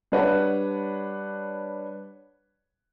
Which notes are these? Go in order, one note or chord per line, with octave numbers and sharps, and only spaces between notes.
G3 D4 B4 C#5 F#5